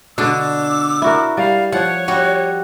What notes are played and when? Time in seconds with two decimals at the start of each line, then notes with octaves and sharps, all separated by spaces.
0.18 B2 D3 D4 D6 E6
1.02 E4 F#4 A#4
1.37 G3 F5
1.72 F3 C#5 F#5
2.08 G3 F#4